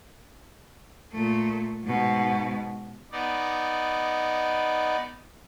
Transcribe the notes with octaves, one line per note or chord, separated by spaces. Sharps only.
A#2 A3
G#2 B2
B3 D#4 D5